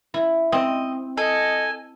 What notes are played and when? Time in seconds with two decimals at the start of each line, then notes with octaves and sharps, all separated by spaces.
0.14 E4
0.52 C4 D#5
1.17 A4 D#5 G#5